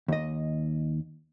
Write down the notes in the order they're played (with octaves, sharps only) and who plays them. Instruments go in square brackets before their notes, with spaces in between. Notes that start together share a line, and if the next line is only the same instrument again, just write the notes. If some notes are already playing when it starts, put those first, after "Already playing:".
[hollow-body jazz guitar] D#2 D#5